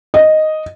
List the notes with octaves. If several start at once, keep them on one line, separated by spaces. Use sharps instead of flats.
D#5